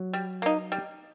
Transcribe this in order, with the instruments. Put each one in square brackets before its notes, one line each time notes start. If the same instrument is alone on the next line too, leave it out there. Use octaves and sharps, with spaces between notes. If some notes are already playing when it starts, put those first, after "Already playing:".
Already playing: [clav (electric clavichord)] F#3
[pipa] G3
A#3 D#4
G3